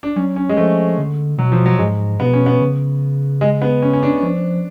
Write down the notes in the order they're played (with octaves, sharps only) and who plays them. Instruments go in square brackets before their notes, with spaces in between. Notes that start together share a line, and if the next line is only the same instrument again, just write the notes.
[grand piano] D4
[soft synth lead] F#3 [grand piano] C#4
[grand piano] C#4
G#3
[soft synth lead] F3 [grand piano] A3
[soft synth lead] D3
[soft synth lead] B2 [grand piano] F#3
[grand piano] F3
F#3
[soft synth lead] G#2 [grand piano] G#3
[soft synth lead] B2 [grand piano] B3
[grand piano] C#4
B3
[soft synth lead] C#3
[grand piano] G#3
B3
C#4
C#4
D4
[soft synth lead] F3 [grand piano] D4